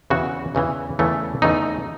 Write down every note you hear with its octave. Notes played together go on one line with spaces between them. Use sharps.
E2 C#3 E3 F#4
E2 C#3 E3
E2 C#3 E3 A3
E2 C#3 E3 A3 D#4